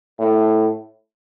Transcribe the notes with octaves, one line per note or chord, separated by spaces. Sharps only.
A2